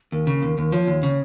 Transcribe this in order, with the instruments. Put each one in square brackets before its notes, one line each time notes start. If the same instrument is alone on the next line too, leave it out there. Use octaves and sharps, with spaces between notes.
[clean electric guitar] D#2 [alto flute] A#4
[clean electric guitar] C#3
D#2
D#2
[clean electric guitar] F3 [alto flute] C#5
[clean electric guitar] D#2
C#3